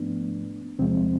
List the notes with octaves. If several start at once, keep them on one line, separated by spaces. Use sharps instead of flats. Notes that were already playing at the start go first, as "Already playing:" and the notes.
Already playing: G#2 F3 A3 B3 D4
E2 C3 F3 G#3 C4